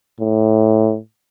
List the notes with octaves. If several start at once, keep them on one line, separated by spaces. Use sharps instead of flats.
A2